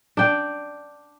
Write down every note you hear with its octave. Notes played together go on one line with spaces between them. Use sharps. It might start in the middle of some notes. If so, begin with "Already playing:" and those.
D4 G5